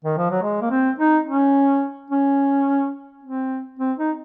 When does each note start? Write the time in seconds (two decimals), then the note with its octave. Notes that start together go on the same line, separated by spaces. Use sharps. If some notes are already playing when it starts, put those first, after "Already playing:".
0.04 D#3
0.17 F3
0.31 F#3
0.43 G#3
0.62 A#3
0.70 C4
0.99 D#4
1.27 C#4
2.10 C#4
3.23 C4
3.79 C4
3.98 D#4